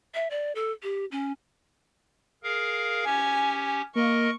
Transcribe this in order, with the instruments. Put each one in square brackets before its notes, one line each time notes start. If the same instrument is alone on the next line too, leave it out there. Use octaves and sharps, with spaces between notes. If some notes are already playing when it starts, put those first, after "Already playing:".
[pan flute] E5
D5
A4
G4
C#4
[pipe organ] G#4 A#4 F5
[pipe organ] C#4 G4 [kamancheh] G#5
[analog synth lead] A#3 [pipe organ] A#4 D#5 [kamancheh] C#6